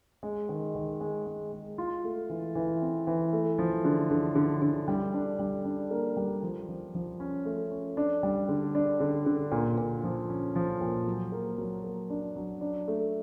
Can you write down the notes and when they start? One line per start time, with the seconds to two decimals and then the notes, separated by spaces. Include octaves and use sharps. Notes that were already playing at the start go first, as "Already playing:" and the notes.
0.23 G#3
0.49 D#3
0.75 D#3
1.01 G#3
1.26 G#3
1.52 G#3
1.78 F4
2.04 A3
2.30 E3
2.55 E3
2.82 C4
3.07 E3
3.33 A3
3.58 F3
3.85 D3
4.11 D3
4.36 D3
4.62 D3
4.88 G3
5.14 D4
5.39 G3
5.65 D4
5.91 A#3
6.17 G3
6.43 F3
6.68 F3
6.94 F3
7.20 C#4
7.45 A3
7.71 C#4
7.97 D4
8.23 G3
8.49 D3
8.75 D4
9.00 D3
9.26 D3
9.52 A#2
9.78 A#2
10.04 F3
10.29 C#4
10.55 F3
10.81 A#2
11.06 F#3
11.32 A#3
11.58 F#3
11.84 A#3
12.10 D4
12.36 F#3
12.61 D4
12.88 A3